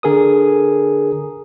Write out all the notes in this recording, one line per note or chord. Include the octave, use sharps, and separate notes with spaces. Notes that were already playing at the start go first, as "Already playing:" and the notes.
D3 G#4 A#4 D#6